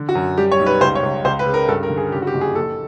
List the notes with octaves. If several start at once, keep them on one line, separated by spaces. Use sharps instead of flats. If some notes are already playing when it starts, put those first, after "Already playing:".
Already playing: D3
F#4
F#2
G3 G4
C#5
B1
B4
C#2 C5
C#5
C#2
C#2 C5
B4
C#3
A#4
G2 A4
A#4
D3
G#4
C#3 G4
F#4
G4
F#1
G#4
A#1 A4